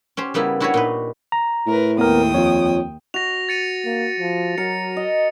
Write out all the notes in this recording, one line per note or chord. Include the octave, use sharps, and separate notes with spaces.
C#4 G4 C5
C#3 G3 A#3 B3 E4
D4 E4 F#4 G4 B4 C#5
A#2 D#4 B4
A#5
A2 A#4 B4
D#2 B3 A#4 G5 D#6
F2 F4 C#5
F#4 A#6 F7
A6 C#7 D#7
A#3
F3
F#3 A#4 C#7
D#5